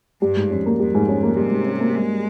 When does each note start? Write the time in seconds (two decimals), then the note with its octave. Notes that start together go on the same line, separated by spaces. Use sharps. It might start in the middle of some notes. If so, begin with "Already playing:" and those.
0.22 G2 G3
0.36 G#2
0.51 F2 C#4
0.66 A#3
0.79 F2 G3
0.95 G#2
1.09 C#4
1.23 A#3
1.36 C3 G3
1.51 G#2
1.66 C#4
1.80 A#3
1.94 G3 G#3